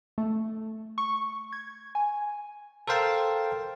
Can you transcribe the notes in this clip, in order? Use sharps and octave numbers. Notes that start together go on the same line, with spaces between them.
A3
C#6
G#6
G#5
A4 A#4 C5 F5 G5 A5